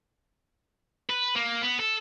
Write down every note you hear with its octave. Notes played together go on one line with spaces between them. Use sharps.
B4
A#3
B3
A4